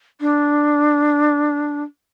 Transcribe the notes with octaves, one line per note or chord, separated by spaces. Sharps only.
D4